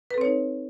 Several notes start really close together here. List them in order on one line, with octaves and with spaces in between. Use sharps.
B4 A4 C4 C#5 D#4